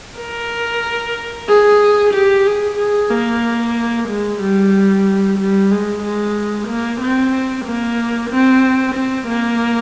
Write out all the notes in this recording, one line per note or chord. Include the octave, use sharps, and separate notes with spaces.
A#4
G#4
G4
G#4
G#4
A#3
G#3
G3
G3
G#3
G#3
A#3
C4
A#3
C4
C4
A#3